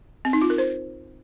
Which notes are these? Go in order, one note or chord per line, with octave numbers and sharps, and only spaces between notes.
C4
D#4
F4
A#4
C5